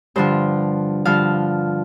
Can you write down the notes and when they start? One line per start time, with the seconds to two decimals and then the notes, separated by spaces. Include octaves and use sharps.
0.16 G2 D3 F3 C5
1.05 G2 D3 F3 F5